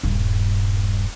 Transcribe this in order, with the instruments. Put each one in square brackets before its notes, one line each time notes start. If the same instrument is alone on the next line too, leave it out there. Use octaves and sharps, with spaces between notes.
[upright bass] D#1 G2